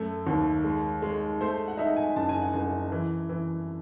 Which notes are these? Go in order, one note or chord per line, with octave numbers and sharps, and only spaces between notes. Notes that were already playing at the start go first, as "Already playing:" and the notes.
Already playing: F#2 A3
D#2
G#3
G#3
A3 C5
F#5
D#4 E5
G#5
F#1 A5
G#5
F#5
F#1 G#5
E3
E3